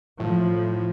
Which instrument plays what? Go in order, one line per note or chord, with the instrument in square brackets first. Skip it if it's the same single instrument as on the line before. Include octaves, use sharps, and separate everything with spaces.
[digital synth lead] A2 [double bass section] F3